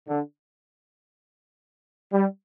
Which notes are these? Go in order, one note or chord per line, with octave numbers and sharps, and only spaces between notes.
D3
G3